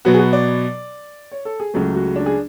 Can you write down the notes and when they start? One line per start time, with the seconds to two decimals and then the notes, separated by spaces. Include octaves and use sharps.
0.05 B2 F#3 B3 F#4
0.14 G#4
0.19 F#4
0.33 D5
1.32 C#5
1.45 A4
1.60 G#4
1.74 C#2 C#3 F#3 A3
1.95 F#4
2.16 D4
2.26 G#4